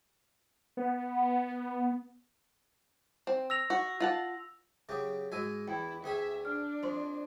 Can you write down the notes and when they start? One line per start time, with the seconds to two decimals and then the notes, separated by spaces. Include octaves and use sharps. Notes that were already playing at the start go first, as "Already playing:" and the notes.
0.77 B3
3.27 C4
3.50 E6 A#6 F7
3.70 F#4
4.00 F4 F#5 A5
4.89 C#3 F#3 G4 E5 D#6
5.32 G#2 G#3 F#4 G#5 E6 D#7
5.68 E2 E4 G5
6.04 D2 G#4 E5 G5 G#5
6.45 D4 F6
6.83 F2 C5 C6